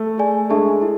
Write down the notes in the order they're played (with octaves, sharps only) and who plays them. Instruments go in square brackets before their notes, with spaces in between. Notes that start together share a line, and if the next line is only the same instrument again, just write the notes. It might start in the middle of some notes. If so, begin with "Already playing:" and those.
Already playing: [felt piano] A3
[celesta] G#4 D5 G#5
[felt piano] G#3 [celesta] D4 A4 E5 A5 C#6
[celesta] E4